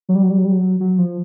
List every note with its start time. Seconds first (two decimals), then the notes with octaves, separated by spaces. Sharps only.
0.09 F#3
0.15 G3
0.23 F#3
0.30 G3
0.38 F#3
0.45 G3
0.52 F#3
0.80 F#3
0.98 F3